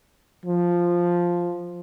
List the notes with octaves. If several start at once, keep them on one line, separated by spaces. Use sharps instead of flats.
F3